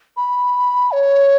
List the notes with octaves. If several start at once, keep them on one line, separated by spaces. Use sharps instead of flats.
B5
C#5